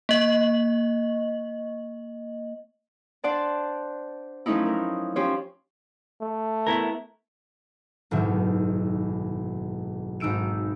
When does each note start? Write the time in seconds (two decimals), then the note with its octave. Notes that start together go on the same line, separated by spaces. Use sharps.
0.09 A#3 D#5
3.24 D4 C5 D5 F#5 A5
4.46 F3 F#3 A3 C#4 D#4 E4
4.66 A#4
5.16 F3 C#4 G4 C5 C#5
6.21 A3
6.67 B3 E4 A#4
8.11 F#1 B1 G#2 D#3 E5
10.20 G#1 D#4 E6 D7 E7